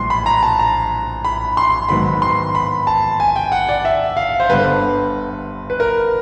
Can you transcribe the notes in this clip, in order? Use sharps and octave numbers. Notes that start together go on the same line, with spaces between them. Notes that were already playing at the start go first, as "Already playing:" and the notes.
Already playing: A#1 A2 E3 G3 C6
B5
A#5
A5
A#5
B5
C6
G#2 D#3 F#3 B3 B5
C6
B5
A5
G#5
G5
F#5
D5
E5
F5
C5
G1 G2 D3 G3 B4
B4
A#4